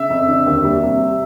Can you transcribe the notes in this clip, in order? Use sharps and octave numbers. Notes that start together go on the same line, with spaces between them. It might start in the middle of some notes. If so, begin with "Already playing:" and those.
Already playing: C#3 E5
F2
D3
D#2
G3
C3